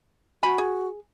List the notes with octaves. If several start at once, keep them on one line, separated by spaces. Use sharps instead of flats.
F#4 G#5 B5
G#4